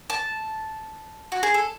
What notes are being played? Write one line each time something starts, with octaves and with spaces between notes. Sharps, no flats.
A5
F#4
G#4
A4